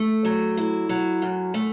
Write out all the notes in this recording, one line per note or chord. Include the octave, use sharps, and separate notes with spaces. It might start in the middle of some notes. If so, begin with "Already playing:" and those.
Already playing: A3
F#3
E4
F#3
F#2
A3